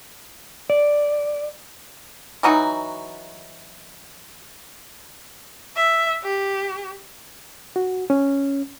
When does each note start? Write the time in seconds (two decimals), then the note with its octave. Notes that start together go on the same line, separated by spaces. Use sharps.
0.70 D5
2.43 E3 F#3 D#4 F#4
5.76 E5
6.24 G4
7.76 F#4
8.10 C#4